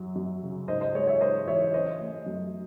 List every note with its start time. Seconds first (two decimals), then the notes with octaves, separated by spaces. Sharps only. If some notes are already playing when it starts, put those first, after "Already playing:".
Already playing: F#2 F#3
0.16 F#2
0.43 C#3
0.68 G#2 C5 D#5
0.81 C5 D#5
0.94 G#3 C#5
1.07 C#5 E5
1.21 G#2 C5 D#5
1.47 E3 C#5 E5
1.74 C#4 C5 D#5
2.01 A3
2.26 F#2